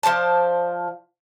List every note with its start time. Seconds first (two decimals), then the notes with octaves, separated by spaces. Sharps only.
0.03 F3 C5 D5 A5